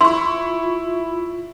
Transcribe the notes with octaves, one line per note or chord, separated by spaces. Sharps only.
E4 F4 C6 C#6